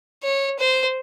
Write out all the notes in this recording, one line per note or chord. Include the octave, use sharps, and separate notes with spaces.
C#5
C5